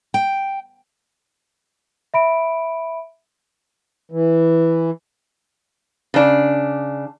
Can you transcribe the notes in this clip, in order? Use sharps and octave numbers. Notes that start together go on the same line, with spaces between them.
G5
E5 B5 D7
E3
C#3 D4